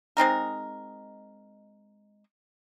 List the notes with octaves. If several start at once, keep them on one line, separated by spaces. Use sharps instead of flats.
G#3 C4 D#4 A#4